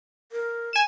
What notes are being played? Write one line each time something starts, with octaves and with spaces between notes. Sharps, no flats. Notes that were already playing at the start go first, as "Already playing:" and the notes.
A#4
G#5 E7